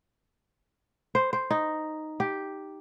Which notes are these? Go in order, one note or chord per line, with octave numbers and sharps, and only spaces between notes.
C5
C5
D#4
G4